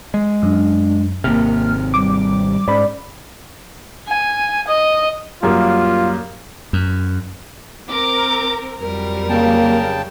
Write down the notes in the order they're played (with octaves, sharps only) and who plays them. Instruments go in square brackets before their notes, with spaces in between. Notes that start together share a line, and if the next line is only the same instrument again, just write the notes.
[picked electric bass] G#3
[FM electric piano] F#2 [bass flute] D4
[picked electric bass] G#1 C3 [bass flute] A#3 [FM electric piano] F6
[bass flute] G3 [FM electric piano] D6
[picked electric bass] G#2 [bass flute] C#4 [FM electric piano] D5 B5
[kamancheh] G#5
D#5
[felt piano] F#2 G3 A#3 [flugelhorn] F4
[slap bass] F#2
[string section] C4 A#4 [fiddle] D6
[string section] F2 F#3 G3 [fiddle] A#4
[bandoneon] C#3 G5 A5 [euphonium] A#3